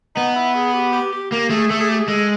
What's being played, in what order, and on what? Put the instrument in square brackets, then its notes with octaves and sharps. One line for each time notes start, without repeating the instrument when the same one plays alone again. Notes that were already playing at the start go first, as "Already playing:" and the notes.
[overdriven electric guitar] B3 [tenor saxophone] D#4
[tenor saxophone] E4
G#4
G4
G4
G4
[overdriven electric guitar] A#3 [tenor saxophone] G4
[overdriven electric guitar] A3 [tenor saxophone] G#4
[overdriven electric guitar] A3 [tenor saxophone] A4
[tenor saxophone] G#4
G4
G#4
[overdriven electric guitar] G#3 [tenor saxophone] A4